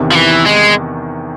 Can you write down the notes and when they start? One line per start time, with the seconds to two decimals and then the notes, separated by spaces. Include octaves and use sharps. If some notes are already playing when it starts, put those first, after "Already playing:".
Already playing: E2 C3 D#3
0.12 F3
0.16 E3
0.46 G#3